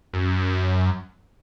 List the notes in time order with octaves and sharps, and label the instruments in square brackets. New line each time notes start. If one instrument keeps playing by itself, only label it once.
[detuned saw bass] F#2